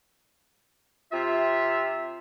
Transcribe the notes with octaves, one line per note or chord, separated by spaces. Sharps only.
C3 F4 E5